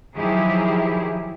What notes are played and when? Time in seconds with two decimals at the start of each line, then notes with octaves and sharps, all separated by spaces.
0.17 D#3 F3 F#3 E4 G4 G#4